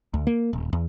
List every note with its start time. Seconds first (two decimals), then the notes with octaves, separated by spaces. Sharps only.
0.14 D2
0.27 A#3
0.53 D#1
0.73 E2